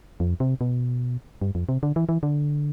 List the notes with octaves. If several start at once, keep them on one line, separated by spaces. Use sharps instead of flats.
F2
C3
B2
G2
F2
C3
D3
E3
E3
D3